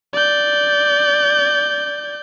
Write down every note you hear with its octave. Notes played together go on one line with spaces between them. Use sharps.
D5 G6